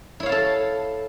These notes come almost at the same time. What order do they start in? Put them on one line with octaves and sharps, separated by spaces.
E4 C#5 F5 A5 A4